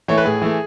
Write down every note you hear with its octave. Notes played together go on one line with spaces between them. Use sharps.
E3 A3 C#5
B4
A2 G#4
E3 A3